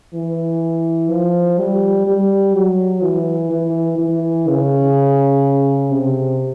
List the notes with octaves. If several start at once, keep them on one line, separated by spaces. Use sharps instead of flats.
E3
F3
G3
G3
F#3
E3
E3
E3
C#3
C3